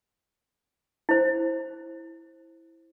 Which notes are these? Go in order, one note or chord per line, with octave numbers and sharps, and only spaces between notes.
E4 C5